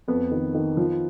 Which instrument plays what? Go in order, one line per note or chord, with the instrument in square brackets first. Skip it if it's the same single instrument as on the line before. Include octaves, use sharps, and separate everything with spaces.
[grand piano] F2 B3
D#3
D#3
F3